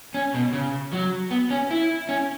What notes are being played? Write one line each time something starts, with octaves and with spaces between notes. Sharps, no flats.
C#4
B2
C#3
F#3
B3
C#4
E4
C#4